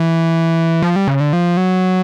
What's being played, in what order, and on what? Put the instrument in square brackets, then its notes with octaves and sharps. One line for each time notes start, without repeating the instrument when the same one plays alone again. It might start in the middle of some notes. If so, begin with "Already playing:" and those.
Already playing: [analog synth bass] E3
F3
G3
C#3
D3
F3
F#3